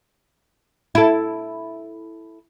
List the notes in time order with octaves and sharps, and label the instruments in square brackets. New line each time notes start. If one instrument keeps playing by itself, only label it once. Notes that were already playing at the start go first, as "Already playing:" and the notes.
[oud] E4 A4